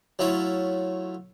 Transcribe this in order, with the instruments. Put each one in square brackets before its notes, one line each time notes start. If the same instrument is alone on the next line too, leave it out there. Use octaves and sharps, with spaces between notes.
[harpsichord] F#3 A3 E4 F4 C#5